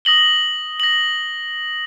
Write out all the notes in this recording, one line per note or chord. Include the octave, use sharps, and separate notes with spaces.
D#6 A#6 F#7 G7
A#6 F#7